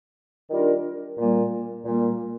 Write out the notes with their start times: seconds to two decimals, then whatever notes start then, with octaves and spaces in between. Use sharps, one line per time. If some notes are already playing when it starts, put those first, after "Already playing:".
0.50 D#3 G3 D4 F4 A#4
1.18 A#2 G3 A#3
1.85 A#2 G3 A#3